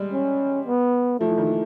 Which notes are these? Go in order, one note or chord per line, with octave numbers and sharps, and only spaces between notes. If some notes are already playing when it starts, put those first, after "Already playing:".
Already playing: G3 G#3
C#4
B3
F3 A3
E3
D#3
E3